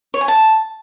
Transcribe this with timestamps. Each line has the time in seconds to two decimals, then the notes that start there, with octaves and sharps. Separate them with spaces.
0.14 C#5
0.21 G#5
0.28 A5